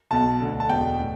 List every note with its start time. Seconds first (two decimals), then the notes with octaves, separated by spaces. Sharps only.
0.11 B1 B2 A5
0.40 D2 D3
0.60 A5
0.69 E1 E2 B2 G5
1.00 A2